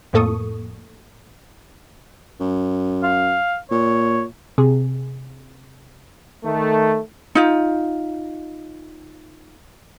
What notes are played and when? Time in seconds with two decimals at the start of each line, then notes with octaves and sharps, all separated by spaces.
0.13 F2 A2 A#3 A4 C#6 D#6
2.40 F#2
3.03 F5
3.71 A#2 C#5
4.58 C3 G#4
6.44 D#3 A3
7.35 D#4 F4